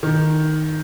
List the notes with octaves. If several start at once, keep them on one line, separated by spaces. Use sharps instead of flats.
D#3